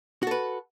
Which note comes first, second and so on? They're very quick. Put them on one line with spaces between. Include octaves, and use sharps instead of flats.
F#4 A4 B4